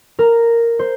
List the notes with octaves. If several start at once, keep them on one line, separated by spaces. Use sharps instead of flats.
A#4
C5